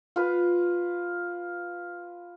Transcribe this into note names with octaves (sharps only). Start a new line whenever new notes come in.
F4 B4